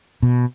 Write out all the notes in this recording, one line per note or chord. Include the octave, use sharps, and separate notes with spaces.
B2